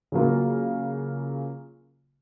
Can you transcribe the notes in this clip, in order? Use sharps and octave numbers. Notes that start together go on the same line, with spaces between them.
C#3 F#3 A#3 F4